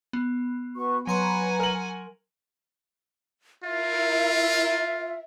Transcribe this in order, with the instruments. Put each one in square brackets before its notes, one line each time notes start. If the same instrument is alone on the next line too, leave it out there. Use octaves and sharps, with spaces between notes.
[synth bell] B3
[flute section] F#4 B4 C#6
[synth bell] F#3 C6 C#6 [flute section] B4 C#5 A#5 [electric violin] F#5 G#5
[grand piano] A#4 F#7
[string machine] E4 A#4 [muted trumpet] F4 [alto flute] E5